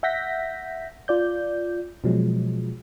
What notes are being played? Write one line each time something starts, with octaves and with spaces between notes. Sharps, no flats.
E5 F#5 G6 A#6 B6
F4 D5 G6
B2 F3 F#3 G#3